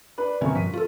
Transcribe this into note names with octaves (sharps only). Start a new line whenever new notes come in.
D4 B4
F#2 B2 D3 A#3 C4 C#6
G2 F3 B6 D#7
F4 A4